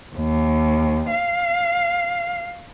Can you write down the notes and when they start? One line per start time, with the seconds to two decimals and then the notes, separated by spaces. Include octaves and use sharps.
0.16 D#2
1.11 F5